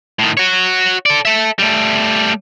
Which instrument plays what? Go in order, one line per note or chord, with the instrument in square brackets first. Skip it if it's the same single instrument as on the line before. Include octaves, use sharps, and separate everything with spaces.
[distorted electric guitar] A2 D#3
F#4 C#5
A4 D5
A4 E5
G3 A3